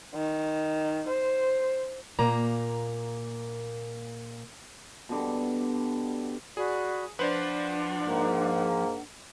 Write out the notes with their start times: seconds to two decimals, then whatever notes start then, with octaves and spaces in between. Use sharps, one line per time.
0.15 D#3
1.09 C5
2.19 A#2 A#3 A#5
5.09 B2 D3 G3
6.57 F#4 G#4 D5 B5
7.19 F3 D4 B4 C5 D5 F#5
8.06 G#2 A#3